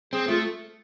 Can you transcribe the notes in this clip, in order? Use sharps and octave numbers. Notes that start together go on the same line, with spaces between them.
C4 G#4
A3 F4